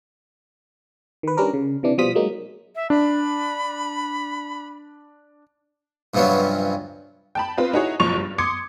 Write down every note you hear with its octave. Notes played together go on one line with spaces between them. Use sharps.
D#3 B4
G3 C#4 D4 A#4 B4
C#3
C3 E3 D4
B2 F3 G3 F4 D#6 B6
F#3 G#3 A#3 D#4
E5
D4 B5
G2 C3 F3 F#3 B3 C#4
G5 A5 B5
B3 C4 F4 B4
D#4 E4 F#4 G#4 C#5
F#1 B1 F3 C#6 A6 F7
G2
C6 D6 D#6 G#6 C#7